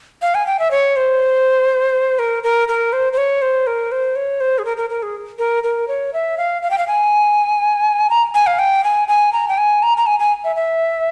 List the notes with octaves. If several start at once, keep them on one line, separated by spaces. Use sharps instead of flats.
F5
G#5
G5
E5
C#5
C5
A#4
A#4
A#4
C5
C5
C#5
C5
A#4
C5
C#5
C5
G#4
A#4
A#4
A#4
G#4
A#4
A#4
C#5
E5
F5
F5
G5
F5
G#5
A#5
G#5
F5
G5
G#5
G#5
A#5
G5
G#5
A#5
A#5
G#5
G#5
E5
E5